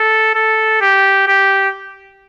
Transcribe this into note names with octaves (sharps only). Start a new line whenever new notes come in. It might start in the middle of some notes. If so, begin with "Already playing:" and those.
Already playing: A4
A4
G4
G4